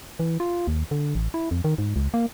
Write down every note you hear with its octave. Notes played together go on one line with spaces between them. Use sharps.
E3
F4
D#2
D3
A1
E4
F2
D#3
G#2
C#2
A#3